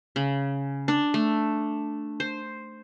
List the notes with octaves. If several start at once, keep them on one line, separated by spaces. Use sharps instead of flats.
C#3
D4
A3
C5